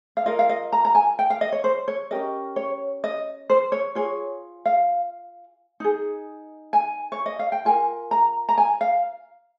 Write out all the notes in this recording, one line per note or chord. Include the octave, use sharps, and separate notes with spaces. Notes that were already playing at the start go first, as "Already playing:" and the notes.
F5
F4 A#4 D#5
F5
D#5
A#5
A#5
G#5
G5
F5
D#5
C#5
C5
C#5
C#4 G4 A#4 D#5
C#5
D#5
C5
C#5
F4 G#4 C#5
F5
D#4 G#4
G#5
C#5
D#5
F5
G5
F4 A#4 G#5
A#5
A#5
G#5
F5